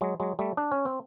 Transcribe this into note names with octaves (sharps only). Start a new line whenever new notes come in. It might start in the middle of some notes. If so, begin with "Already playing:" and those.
F#3 G#3
F#3 G#3
G3 A3
D4
C#4
C4